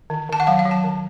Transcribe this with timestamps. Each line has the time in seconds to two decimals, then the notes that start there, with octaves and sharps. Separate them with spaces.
0.10 D#3
0.29 D#3 A5
0.40 F#5
0.47 F#3 F5
0.59 F5
0.65 F#3
0.71 A5
0.84 D#3